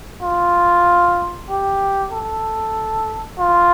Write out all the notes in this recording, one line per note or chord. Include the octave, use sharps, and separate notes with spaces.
F4
G4
A4
F4